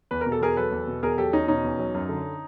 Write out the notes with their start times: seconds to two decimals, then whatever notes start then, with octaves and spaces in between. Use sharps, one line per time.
0.11 E2 B4
0.21 A#4
0.26 B2
0.32 A4
0.41 E2 G#4 A#4
0.57 F#3 A4 B4
0.72 E2
0.87 B2
1.02 E2 G#4 A#4
1.18 F#3 G4 A4
1.33 E2 C#4 D#4
1.48 B2 C#4 D#4
1.64 E2
1.79 F#3
1.94 F#2
2.09 D3